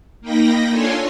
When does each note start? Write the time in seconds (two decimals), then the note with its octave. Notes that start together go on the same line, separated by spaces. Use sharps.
0.21 A#3 D#4 G5 B5 A#6
0.70 D4 F4 A4 C#5 G#5 C6